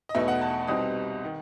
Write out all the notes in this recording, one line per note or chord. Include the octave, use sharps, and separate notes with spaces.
D#5
E2 B2 A3 D#4 E5
F#5
A5
C2 B2 G3 C4 D#4 D#6
D#3